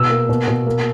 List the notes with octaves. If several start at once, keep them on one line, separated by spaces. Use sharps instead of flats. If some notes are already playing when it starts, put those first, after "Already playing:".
Already playing: B2 E6
A#3
B2
B2
A#3